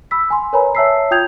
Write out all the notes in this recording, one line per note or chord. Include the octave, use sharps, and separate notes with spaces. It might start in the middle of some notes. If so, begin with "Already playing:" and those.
B5 E6 B6
G#5 C6
A#4 B4 C#5 G#5 A#5 B5
C#5 E5 A5 E6 B6 C7
F4 G5 D#6 G6 G#6 F7